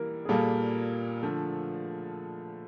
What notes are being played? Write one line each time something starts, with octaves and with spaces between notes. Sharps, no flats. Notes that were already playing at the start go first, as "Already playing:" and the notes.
Already playing: E3 G3 A#3 A#4
G#4
A#2 G3 A#3 A4
D3 F3 A3